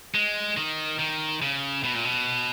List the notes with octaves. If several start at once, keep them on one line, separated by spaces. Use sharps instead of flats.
G#3
D#3
D#3
C#3
B2
A#2
B2